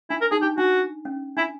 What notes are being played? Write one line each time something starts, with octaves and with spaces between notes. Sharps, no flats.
D4 E4
A#4
D#4 G#4
D4 G4
D4 F#4
C#4
D4 E4